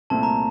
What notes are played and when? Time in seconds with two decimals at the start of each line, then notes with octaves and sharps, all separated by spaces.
0.10 C2 A#2 A3 C4 A5
0.23 A#5